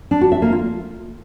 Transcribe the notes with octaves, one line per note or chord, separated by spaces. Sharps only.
D4
F#4
E5
A#3
F4